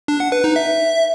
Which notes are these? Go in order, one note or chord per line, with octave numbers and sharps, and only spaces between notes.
D4
F#5
B4
D#4
E5